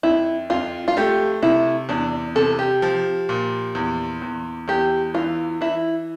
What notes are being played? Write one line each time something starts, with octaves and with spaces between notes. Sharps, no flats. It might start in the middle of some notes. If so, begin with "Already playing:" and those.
F2 E4
F2 F4
F4
A3 G4
C3 E4
E2 D4
C3 A4
G4
F3
A#2
E2
E2
E2 G4
E3 F4
E3 E4